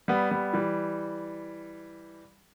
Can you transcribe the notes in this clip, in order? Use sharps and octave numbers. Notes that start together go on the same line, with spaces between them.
G3 B3
G3 B3
E3 G3